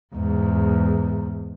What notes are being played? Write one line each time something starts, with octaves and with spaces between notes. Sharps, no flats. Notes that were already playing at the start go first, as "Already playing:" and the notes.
E2 G#2